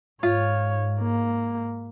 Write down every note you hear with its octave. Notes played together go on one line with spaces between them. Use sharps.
G#2 F4 C#5
A#3